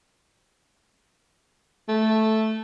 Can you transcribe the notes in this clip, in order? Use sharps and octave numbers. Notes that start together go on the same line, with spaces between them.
A3